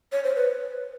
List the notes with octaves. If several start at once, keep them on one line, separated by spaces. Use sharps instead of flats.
C#5
C5
B4